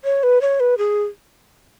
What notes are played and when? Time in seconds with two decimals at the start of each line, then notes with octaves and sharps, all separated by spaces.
0.04 C#5
0.23 B4
0.41 C#5
0.60 B4
0.78 G#4